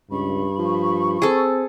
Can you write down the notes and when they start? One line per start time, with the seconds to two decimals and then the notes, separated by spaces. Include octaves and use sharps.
0.11 C#2 G2 B5 C#6
0.59 F3
1.22 C4 G#4 A4